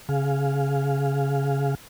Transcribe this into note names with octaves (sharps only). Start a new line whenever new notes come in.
C#3 G#4 F5